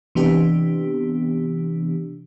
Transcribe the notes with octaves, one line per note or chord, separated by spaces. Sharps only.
C3 E3 B3 D4 G4